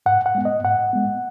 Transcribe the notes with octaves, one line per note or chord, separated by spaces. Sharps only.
G#2 F#5
F#5
G#3 B3
D#5
G#2 F#5
G#3 B3